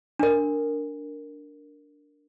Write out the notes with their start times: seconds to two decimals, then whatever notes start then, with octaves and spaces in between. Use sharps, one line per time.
0.19 D4 A#4